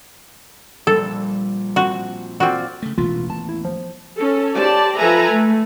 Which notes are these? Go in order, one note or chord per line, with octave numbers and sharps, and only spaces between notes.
A#1 G3 A4
C4 F#4
C4 F4 F#4 D5
C#3 A3
E1 A1 E3 B3 F4
D#2 A5
E4
F3
C#4 A4
G4 C5 D5 A5
F3 A4 B4 E5 G#5 A#5
A3